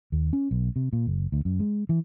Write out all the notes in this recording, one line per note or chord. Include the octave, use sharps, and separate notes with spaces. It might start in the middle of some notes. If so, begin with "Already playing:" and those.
D#2
C#4
B1
C3
A#2
F#1
D2
F#2
G#3
E3